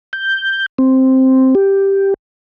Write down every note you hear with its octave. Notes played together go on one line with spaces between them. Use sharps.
G6
C4
G4